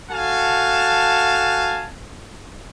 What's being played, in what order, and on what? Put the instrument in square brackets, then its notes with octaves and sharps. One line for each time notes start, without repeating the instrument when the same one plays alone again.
[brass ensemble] F#4 A4 F5 G#5 A5